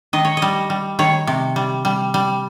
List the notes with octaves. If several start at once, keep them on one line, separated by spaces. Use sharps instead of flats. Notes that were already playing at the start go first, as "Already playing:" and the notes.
D#3 D#5
C#5
D#5
G3
G3
D#3 C#5
C3
G3
G3
G3